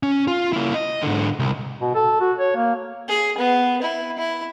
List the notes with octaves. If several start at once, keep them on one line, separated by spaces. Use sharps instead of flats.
C#4
F4
A#3 E4
D#5
G#2 D3
C2
B2
A4
F#4
C#5
A#3
G#4
B3
E4
E4